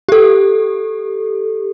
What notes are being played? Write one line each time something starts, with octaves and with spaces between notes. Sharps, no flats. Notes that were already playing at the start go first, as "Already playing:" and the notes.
G4 A4